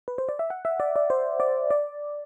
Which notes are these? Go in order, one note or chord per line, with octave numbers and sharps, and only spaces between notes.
B4
C5
D5
E5
F#5
E5
D5
D5
C5
D5
D5